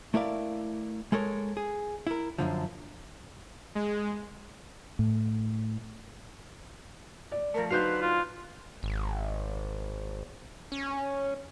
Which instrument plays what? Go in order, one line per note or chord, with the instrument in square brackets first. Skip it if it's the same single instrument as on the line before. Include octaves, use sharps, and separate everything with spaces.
[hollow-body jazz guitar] A3 E4 A#4 D5 F5
G#3 A4 A#4 C#5
G#4
E4 A#4
F#2 D3 F3
[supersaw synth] G#3
[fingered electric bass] A2
[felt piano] D5
[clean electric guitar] F3 A3 [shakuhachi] A#4
[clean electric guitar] D3 C5 F5 [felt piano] F#3 D#4 G6 [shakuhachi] B4
[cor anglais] F4
[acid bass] G#1
C#4